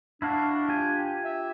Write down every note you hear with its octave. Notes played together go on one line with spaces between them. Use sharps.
D4 E4 F#4 F5
F4 G4 G#5
E5